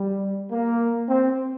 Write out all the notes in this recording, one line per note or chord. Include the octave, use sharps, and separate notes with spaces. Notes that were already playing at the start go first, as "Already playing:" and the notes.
Already playing: G3
A#3
C4